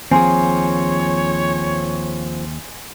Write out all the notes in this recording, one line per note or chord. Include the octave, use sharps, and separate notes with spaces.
D#2 F3 C4 G#4 C#5 G#5 C6